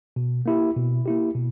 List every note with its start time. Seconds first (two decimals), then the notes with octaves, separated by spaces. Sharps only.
0.16 B2
0.46 A#3 E4 G4
0.76 B2
1.06 A#3 E4 G4
1.35 B2